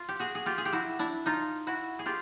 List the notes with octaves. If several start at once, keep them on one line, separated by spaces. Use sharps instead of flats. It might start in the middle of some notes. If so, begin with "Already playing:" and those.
Already playing: F4
G4
F#4 G#4
G#4
F4 G4
G#4
G4
E4 F#4
D4 E4
D#4 F4
E4 F#4
G#4
F4 G4